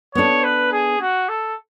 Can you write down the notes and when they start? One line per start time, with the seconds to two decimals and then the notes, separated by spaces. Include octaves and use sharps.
0.15 B3 D4 A4 C#5
0.44 B4
0.72 G#4
1.01 F#4
1.29 A4